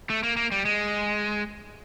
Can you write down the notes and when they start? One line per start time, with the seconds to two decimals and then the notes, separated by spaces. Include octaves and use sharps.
0.10 A3
0.23 A#3
0.37 A#3
0.52 G3
0.65 G#3